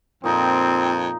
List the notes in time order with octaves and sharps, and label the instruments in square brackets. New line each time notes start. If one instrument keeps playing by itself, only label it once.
[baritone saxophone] F2 [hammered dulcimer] A#2 D#4 B5 [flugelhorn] C4